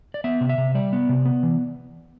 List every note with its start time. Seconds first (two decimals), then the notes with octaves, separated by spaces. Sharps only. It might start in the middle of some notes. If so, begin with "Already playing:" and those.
0.14 D5
0.24 B3 E5
0.41 C3
0.49 E5
0.58 C3
0.75 G3 D5
0.93 B3
1.09 C3
1.25 B3
1.43 E3